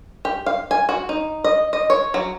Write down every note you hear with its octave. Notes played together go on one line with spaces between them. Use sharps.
G4
F5
G#5
F#4
D#4
D#5
D#5
C#5
F#3